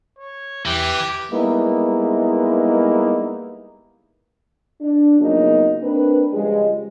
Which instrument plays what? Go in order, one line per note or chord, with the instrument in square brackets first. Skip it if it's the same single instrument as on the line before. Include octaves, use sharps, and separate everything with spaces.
[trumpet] C#5
[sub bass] E2 [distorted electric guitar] E3 [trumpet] G4
[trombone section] G3 G#3 A#3 B3 D#4 E4
[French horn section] D4
C#3 F3 F#3 A#3 B3 D#4
A#3 C4 D4 B4
C#3 F3 G3 G#3